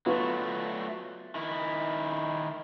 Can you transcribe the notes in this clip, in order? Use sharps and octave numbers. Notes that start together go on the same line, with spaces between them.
F#3 A3 B3 F4 C#6
D#3 E4